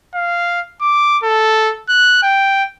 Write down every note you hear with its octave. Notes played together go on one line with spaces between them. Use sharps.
F5
D6
A4
F#6
G5